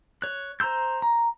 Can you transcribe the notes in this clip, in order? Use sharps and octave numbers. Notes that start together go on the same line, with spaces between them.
C#5 F#6
C5 A#5 C6 E6 G6
A#5